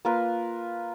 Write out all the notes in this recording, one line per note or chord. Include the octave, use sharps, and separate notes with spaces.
A#3 F4 A#4 B4